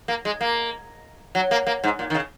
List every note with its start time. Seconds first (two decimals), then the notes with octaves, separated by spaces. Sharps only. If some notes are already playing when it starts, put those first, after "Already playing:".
0.08 A#3
0.25 G#3
0.41 A#3
1.35 F#3
1.51 A#3
1.67 A#3
1.84 G#2
1.99 A#2
2.10 D#3
2.15 C#3